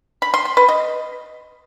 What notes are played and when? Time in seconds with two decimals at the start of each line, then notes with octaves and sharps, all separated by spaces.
0.22 B5
0.34 C6
0.45 C6
0.57 B4
0.68 D#5